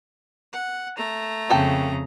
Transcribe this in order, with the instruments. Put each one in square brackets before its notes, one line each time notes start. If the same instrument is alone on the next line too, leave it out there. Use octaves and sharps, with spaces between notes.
[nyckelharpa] F#5
A3 A#5
[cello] F2 C#3 [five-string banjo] A#3 A4 G5